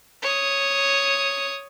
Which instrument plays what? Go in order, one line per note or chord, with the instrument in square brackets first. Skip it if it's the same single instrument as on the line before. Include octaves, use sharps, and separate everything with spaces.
[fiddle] C#5 D#6